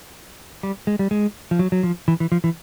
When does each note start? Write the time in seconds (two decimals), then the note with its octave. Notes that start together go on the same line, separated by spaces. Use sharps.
0.63 G3
0.87 G#3
0.99 G3
1.11 G#3
1.51 F3
1.59 F#3
1.72 F#3
1.83 F3
2.08 E3
2.20 E3
2.32 F3
2.44 E3